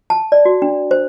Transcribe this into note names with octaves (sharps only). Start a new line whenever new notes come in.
A5
D5
F#4
D4
C5